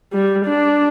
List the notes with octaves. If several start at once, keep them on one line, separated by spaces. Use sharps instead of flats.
G3
D4